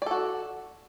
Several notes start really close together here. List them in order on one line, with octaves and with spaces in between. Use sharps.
D5 A4 F#4